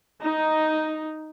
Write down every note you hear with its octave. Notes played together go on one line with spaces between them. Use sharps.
D#4